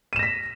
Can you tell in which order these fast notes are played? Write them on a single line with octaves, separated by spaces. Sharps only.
D#7 E7 A#6 B6